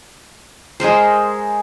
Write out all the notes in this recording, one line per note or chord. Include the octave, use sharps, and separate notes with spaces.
G#3 G#4 A#4 C5